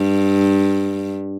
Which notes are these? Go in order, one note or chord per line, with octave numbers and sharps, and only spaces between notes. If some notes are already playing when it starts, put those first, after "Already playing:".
Already playing: G2